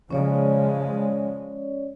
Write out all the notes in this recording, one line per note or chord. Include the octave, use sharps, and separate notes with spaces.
C#3 F3 G#3 C#4 C#5 D5